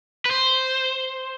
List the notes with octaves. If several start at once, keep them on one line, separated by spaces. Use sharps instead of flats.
B4
C5